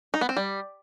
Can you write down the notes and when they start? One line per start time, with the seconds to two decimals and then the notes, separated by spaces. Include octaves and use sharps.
0.14 D#4
0.21 B3
0.29 C4
0.37 G3